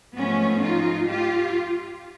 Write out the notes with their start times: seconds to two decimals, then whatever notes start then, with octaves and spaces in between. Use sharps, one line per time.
0.15 G#2 F3 A3 B3 C#4
0.61 D#4 F4
1.07 F4 G4